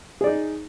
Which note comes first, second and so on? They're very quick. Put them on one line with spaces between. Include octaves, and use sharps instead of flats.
G#4 D5 D#4